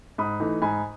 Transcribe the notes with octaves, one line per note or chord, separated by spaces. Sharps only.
G#2 B5 D#6
E3 A3 D#4
G#2 G#5 B5